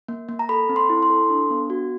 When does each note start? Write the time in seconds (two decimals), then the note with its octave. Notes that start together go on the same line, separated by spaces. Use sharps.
0.08 A#3
0.29 A#3
0.39 A#5
0.49 A4 B5
0.69 C4
0.76 C6
0.90 E4
1.02 C6
1.10 A4
1.30 D4
1.50 B3
1.70 F#4